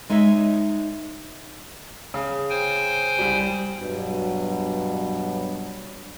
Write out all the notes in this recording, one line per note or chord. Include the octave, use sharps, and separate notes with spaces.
G#3 D#4 C#5 E5
C#3
C5 G5 G#5
C2 G3
G2 B2 F#3